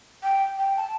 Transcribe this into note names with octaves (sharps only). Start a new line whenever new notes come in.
G5
G5
A5